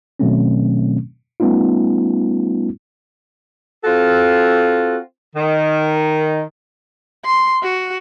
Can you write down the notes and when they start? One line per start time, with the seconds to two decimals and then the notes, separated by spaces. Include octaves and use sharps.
0.20 B2 D#3 F#3 A3 C4 C#4
1.40 G3 A3 B3 C#4 D#4 F4
3.84 C4 F4 F#4 A4
5.36 D#3
7.25 C6
7.63 F#4